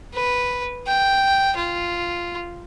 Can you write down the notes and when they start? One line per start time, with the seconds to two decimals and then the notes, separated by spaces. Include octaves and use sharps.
0.14 B4
0.87 G5
1.56 F4